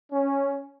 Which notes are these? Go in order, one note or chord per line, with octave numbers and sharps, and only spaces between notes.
C#4